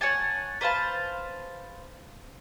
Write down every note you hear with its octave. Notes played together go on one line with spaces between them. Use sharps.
C#5 F#5 G#5 A5
B4 C5 F5 A5